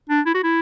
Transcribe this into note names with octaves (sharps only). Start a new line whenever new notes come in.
D4
E4
F#4
E4